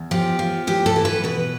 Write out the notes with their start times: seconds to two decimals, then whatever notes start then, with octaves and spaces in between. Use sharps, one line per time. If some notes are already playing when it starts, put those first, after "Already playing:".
Already playing: E2
0.11 F3 G4
0.39 F3
0.67 E3 G4
0.86 A4
0.96 E3
1.05 B4
1.24 B2 B4